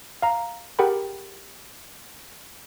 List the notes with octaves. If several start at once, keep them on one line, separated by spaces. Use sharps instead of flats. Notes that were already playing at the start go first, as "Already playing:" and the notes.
F5 A#5
G4 G#4 A#4 F#5 G5 B5